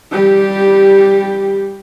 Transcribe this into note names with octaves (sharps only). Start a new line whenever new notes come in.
G3 G4